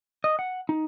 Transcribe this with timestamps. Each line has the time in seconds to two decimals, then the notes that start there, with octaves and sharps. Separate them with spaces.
0.24 D#5
0.39 F#5
0.69 D#4